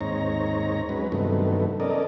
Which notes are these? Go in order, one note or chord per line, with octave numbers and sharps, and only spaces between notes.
D#2 G#2 C4 D#4 C#5 A#5
F#3 G#3 C#4 B4
G2 C3 D#3 F#3 A3 B3
B3 C#4 A4 A#4 D5 D#5